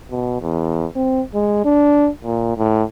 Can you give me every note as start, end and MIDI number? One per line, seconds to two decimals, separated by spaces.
0.11 0.41 47
0.42 0.86 40
0.95 1.22 60
1.34 1.65 56
1.65 2.10 62
2.24 2.53 46
2.58 2.83 45